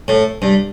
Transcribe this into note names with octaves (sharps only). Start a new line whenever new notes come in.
A2
G2